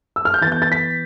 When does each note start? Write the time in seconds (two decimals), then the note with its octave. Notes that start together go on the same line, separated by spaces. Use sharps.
0.16 E6
0.25 F6
0.34 G6
0.41 E3 A6
0.46 B3
0.52 G6
0.62 A6
0.72 B6